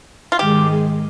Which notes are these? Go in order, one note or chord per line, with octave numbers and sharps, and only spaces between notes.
F4
G#2 D#3 G#3 D#4 G4 G#4